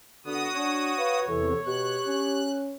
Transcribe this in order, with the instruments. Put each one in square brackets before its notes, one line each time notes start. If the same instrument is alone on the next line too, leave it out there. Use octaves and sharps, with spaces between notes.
[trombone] D3 [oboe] B3 [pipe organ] F#4 D#6
[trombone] D4 [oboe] C#5
[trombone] B4 [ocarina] F5
[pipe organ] E2 C3 [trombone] E3 [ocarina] A4
[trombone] B2 [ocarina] G4 [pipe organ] F#6
[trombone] C#4